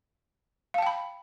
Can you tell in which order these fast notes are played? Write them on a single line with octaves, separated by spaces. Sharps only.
F5 A5 G5 B5